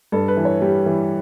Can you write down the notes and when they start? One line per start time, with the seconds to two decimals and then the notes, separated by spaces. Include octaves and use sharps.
0.12 G2 A4
0.28 B4
0.37 E3
0.45 C#5
0.61 G3 G4
0.86 E3